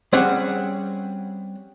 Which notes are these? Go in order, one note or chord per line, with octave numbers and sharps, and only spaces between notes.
G3 C4 C#4 G#4 F#5